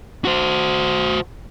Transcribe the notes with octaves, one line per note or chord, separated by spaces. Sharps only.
F#4 C5